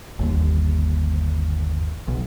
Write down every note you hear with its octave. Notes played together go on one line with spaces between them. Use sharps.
G1 D#2
B1